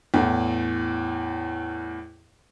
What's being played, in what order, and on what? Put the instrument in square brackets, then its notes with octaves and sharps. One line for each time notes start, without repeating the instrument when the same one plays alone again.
[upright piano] E2 A2